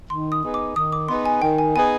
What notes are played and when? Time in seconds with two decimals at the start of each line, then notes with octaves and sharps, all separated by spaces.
0.10 D#3 C6
0.32 D#6
0.43 B3 D#4 G#4 B4
0.54 D6
0.76 D#3 D#6
0.92 D6
1.09 B3 D#4 G#4 B4 C6
1.26 G#5
1.42 D#3 G5
1.58 G#5
1.76 B3 D#4 G#4 B4 G#5